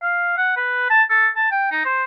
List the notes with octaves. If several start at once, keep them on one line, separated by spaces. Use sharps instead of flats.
F5
F#5
B4
A5
A4
A5
G5
D#4
C5